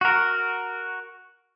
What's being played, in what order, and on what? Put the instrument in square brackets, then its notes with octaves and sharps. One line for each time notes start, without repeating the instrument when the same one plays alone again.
[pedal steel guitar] F#4 A#4